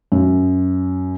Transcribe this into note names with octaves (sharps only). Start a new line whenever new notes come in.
F#2